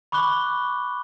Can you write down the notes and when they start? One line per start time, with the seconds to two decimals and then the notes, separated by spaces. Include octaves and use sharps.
0.12 B5 C#6 D6 F#6 G7